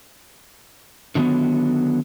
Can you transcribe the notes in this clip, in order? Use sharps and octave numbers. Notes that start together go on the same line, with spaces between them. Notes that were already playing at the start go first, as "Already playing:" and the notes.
D3 D#3 F#3 G#3 B3